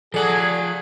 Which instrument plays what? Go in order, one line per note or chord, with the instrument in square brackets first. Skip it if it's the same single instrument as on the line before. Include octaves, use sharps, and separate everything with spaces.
[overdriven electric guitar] F3 F#5 [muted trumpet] G#4 [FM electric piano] A4 D5 A5